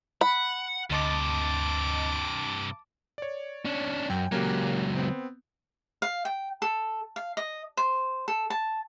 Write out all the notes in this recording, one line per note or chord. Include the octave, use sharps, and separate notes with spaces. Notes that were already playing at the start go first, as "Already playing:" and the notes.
F#5 B5
D2 G2 C3 D#5 A5 D6 A6
C#5 D5
C#4 D4
F#2 G5
C#2 F#3 A#3 C#4 G4
B3 C4
F5
G5
A4
F5
D#5
C5
A4
A5